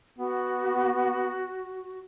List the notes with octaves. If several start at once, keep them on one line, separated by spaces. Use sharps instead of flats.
B3 F#4